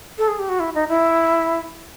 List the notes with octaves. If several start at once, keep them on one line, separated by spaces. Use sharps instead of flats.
A4
G#4
G4
F#4
E4
D#4
E4